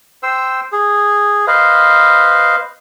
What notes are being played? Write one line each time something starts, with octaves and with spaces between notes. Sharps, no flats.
C5 G5 E6
G#4
B4 C5 D#5 F5